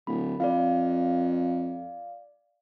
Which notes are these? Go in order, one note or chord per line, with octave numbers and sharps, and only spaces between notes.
D1 B5
F2 D5 F5